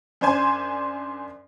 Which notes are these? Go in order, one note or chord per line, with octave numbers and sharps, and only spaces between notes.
F#2 D4 C5 G#5 C6